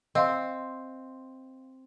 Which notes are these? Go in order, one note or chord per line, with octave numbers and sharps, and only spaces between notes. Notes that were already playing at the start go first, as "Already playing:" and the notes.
C4 D#5 F5 C6